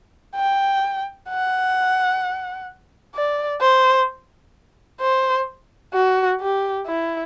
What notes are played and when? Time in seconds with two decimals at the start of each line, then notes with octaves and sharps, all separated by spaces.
0.35 G5
1.30 F#5
3.15 D5
3.61 C5
5.01 C5
5.94 F#4
6.41 G4
6.87 E4